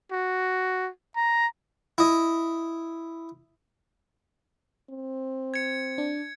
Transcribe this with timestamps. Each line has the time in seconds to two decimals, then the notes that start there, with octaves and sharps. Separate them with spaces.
0.12 F#4
1.16 A#5
1.98 E4 D#5
4.90 C4
5.54 G#6 C#7
5.98 D4